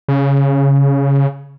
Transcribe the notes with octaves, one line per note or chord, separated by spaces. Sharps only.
C#3